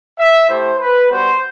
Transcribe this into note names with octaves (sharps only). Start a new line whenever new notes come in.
E5
A3 E4 G4 C5
B4
G3 B3 F#4 C5